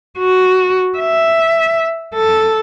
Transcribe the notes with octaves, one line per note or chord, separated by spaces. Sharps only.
F#4
E5
A4